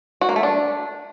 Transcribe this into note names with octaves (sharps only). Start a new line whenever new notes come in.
F#4
A#3
A3
D4